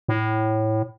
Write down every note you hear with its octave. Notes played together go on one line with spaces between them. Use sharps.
A2